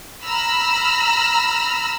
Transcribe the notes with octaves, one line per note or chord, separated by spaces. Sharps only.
A#5 B5 E6 F6